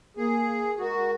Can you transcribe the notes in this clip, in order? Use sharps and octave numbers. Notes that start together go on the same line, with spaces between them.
A#3 G#4
G#3 F#4 A#4